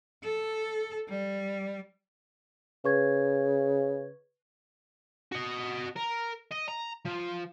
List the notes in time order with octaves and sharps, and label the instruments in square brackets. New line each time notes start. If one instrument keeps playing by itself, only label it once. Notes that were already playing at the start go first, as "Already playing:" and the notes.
[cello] A4
G3
[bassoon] C#3 [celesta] B4 C#6 G#6
[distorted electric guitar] F#4 D#5
A#4
D#5
A#5
F3